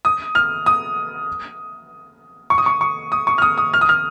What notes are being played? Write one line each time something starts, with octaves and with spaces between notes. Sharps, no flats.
D#6
F6
D#6
C#6
D#6
C#6
C#6
D#6
C#6
F6
D#6
D#6
F6
D#6
F6